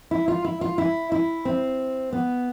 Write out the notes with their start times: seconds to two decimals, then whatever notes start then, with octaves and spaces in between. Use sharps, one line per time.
0.11 E4
0.28 F4
0.45 E4
0.61 F4
0.78 E4
1.12 E4
1.45 C4
2.13 B3